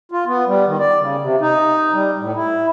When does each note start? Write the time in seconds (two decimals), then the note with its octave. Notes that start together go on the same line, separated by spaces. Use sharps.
0.12 F4
0.27 B3
0.47 G3
0.67 D#3
0.80 D5
1.01 C#3
1.21 C3
1.41 D#4
1.93 G3
2.19 A2
2.35 E4